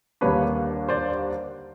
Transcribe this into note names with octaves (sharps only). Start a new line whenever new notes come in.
D#2 D3 G3 A#3 D4 B4 C#5
C5 D5